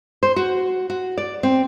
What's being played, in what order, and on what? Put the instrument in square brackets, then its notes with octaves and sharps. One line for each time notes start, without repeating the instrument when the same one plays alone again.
[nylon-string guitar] C5
F#4
F#4
D5
C4